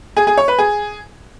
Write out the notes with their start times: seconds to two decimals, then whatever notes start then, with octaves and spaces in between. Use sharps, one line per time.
0.17 G#4
0.27 G#4
0.37 C#5
0.48 B4
0.58 G#4